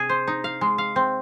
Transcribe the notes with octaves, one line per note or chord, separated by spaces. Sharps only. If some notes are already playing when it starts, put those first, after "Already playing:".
Already playing: C3 G#4
C5
D#4
F5
G#3
F5
C4